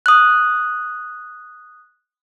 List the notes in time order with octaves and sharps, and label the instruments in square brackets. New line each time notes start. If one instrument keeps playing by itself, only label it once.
[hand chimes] D#6 F#6